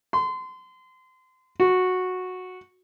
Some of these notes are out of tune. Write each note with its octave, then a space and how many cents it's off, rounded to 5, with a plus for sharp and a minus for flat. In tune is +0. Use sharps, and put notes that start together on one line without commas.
C6 -30
F#4 -10